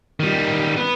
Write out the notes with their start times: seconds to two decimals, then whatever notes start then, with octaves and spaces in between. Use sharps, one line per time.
0.20 D#3 G3
0.76 B3